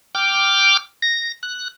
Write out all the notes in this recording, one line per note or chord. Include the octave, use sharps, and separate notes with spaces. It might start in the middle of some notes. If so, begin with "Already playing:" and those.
G5 D6 F6
A#6
F#6